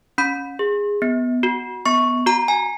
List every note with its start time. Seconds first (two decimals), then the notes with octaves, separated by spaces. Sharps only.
0.18 C#4 B5
0.59 G#4
1.02 B3
1.43 F#4
1.86 B3 C#6
2.26 F#4 A#5
2.48 G#5